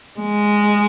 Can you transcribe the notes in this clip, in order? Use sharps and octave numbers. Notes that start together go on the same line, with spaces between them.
G#3